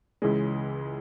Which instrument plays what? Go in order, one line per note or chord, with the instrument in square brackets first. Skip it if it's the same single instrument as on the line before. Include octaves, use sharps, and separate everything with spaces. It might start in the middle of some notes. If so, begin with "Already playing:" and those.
[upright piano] C#2 C#3 E3 G#3